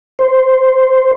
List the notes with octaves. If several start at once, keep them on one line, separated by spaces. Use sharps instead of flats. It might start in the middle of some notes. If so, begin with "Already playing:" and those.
C5